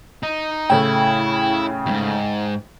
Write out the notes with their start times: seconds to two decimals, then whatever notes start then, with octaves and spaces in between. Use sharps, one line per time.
0.23 D#4
0.70 A2 C#3 A3 E4 G5
1.86 D#2 G#2